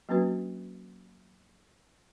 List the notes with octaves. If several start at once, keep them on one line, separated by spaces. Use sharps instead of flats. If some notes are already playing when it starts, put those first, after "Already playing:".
F#3 A#3 C4 C#4 F#4 B4